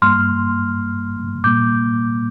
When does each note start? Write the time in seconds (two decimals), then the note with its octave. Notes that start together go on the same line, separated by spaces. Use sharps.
0.02 G2 G3 A#3 C6 F6
1.44 A#2 G3 A#3 D6 G6